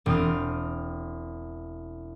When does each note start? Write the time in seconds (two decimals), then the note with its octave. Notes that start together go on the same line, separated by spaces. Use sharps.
0.06 E1 C4 D#6 F6